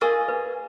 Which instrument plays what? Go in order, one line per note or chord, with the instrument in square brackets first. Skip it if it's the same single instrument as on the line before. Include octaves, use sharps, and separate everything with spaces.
[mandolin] F4 G#4 D#5 G#5 [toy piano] A#4
[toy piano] B4